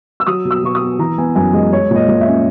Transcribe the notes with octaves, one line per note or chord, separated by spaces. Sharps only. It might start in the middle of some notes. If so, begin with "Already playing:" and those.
E6
F#3 D#6
B2
E6
B2 C#6
D#6
B3
E3 A#5
B3 G#5
F#2 G#5
G#3 D#5
G#3 C#5
A#2 D#5
A#2
E5
C#4